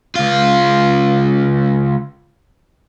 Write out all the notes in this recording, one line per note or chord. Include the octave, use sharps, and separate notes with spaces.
C#2 F4